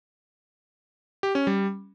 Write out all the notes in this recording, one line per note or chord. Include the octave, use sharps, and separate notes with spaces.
G4
C#4
G3